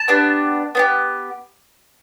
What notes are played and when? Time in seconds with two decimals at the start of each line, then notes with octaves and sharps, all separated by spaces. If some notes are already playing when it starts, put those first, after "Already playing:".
Already playing: A5
0.08 B3 D4 G4
0.75 B3 D4 G4